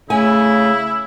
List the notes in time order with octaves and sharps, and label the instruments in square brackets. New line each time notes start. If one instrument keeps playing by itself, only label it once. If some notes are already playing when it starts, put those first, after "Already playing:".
[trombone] C#3 [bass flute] A3 [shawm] E4 [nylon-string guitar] G#5